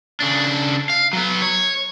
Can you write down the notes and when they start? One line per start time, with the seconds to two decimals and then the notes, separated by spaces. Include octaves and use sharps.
0.20 C#3 D4
0.90 F5
1.13 F#3 B3
1.42 C#5